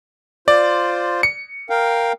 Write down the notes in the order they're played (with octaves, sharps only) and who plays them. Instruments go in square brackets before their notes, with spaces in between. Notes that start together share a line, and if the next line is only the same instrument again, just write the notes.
[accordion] F4 C5 [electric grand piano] D5
[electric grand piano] C#7
[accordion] A#4 F5 G5